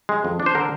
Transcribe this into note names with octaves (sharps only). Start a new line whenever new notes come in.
G#3
F2
D4
C5
D3 A#4